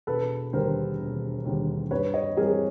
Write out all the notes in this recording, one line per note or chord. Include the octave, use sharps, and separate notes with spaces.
E1 A4 B4
D#2 D3 G3 A#4 C5
E1
D#2 D3 G3
G2 B4 C#5
C#5 D#5
E3 G3 C4 G#4 A#4